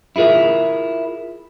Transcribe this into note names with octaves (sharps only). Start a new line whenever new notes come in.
E4 F4 G#4 A#4 E5